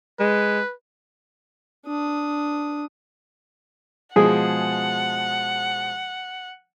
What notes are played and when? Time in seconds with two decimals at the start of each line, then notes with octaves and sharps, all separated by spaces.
0.20 G#3 B4
1.86 D4 D#6
4.16 B2 F3 G#3 G#4 F#5